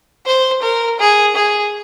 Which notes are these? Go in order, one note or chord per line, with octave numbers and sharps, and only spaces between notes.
C5
A#4
G#4
G#4